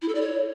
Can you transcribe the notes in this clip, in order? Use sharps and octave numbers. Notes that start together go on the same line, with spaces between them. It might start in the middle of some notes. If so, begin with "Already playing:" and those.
E4
A4
D5
C#5